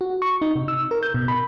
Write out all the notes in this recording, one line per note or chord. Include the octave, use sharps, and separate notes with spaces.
F#4
C#6
D#4
C3
E6
A#4
G6
B2
B5